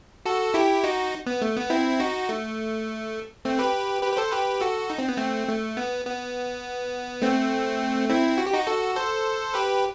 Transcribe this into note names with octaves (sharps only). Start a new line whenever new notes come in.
F#4 A4
E4 G4
D#4 F#4
B3
A3
B3
C4 E4
D#4 F#4
A3
A3 C4
G4 B4
G4 B4
B4
A4 C5
G4 B4
F#4 A4
D#4
C4
B3
A3 C4
A3
B3
B3
A3 C4
C4 E4
F#4
G4
D#4 F#4
F#4 A4
A4 C5
G4 B4